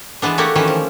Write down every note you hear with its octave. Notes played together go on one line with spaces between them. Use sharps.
E3 G#3 B3 D4
A3 A#3 F#4 G4
D#3 E3 C#4 G4
F3